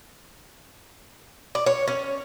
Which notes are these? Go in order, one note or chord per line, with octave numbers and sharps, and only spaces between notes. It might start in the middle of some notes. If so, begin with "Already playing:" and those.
D5
C#5
C#4